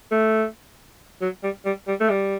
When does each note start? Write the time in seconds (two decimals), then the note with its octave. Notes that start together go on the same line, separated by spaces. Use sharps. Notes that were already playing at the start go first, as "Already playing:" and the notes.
0.11 A3
1.21 F#3
1.43 G3
1.65 G3
1.87 G3
2.00 A3
2.10 G3